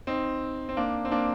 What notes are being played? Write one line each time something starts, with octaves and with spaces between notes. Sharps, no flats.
C4 D#4
C4
A#3 D4
C4
A#3 D4